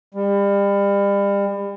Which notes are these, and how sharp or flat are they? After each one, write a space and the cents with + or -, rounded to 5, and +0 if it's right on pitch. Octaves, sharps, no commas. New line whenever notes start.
G3 +35